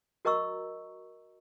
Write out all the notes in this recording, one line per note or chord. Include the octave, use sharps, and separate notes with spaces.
F#4 A#4 D#5 A#5 C#6 E6